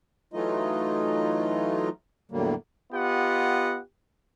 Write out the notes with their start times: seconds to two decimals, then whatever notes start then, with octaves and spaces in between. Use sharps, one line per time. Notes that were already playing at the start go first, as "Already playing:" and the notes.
0.33 E3 F#3 A3 D#4 F4 D#5
2.31 E2 A2 D3 F#3 G3 A#3
2.92 B3 F4 G4 D#5 F#5